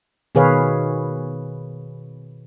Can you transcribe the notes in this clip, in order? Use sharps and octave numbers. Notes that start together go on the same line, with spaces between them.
B2 D#3 G#4 B4 C#5 F5